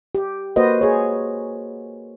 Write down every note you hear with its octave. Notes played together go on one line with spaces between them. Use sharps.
G4
A#3 F#4 B4 C5 D#5
G#4 C#5